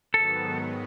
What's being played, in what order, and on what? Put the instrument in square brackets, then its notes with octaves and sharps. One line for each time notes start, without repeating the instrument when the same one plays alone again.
[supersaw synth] G#2 D#3 F#3 B3 [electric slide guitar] A4